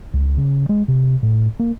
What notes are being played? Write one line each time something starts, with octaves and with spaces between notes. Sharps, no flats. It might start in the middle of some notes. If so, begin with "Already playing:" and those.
C#2
C#3
G#3
C3
A2
A#3